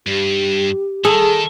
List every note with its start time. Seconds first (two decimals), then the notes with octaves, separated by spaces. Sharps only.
0.07 G2 G4
1.05 D#3 G#4 A4